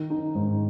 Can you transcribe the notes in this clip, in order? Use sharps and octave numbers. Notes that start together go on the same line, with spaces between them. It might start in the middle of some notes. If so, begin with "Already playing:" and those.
Already playing: D#3
D#4
G#2